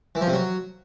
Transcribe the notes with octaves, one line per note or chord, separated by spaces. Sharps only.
E3
F3
C3
F#3